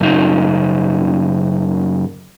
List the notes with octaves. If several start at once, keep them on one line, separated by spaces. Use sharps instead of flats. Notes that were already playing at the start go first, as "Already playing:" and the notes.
F#2 C#3 D#4